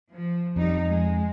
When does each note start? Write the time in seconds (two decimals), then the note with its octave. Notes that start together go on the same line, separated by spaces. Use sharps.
0.10 F3
0.56 F2 G3 D#4
0.88 G#3